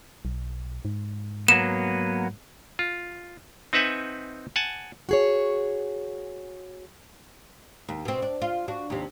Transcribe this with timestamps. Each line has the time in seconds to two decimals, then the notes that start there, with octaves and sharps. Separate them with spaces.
0.25 B1
0.85 G#2
1.48 F#3 A#3 B3 E7
2.79 F4
3.73 C4 D#4 B4 E5 F#5 G#5
4.56 F#5 G#5 A5
5.09 F#4 G#4 C#5
7.88 D#2
8.05 B2 C4
8.22 D4
8.42 F4
8.68 D4 F#4
8.90 D#2 C3